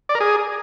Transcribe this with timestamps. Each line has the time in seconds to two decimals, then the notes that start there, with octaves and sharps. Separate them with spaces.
0.09 D5
0.15 A#4
0.21 G#4